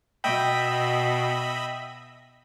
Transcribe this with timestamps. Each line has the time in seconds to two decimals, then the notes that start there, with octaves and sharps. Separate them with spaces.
0.24 B2 D#5 E5 G5 B5